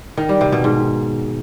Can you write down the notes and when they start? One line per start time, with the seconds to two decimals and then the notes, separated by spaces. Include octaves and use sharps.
0.17 D#3
0.29 G3
0.41 C3
0.52 B2
0.64 G#2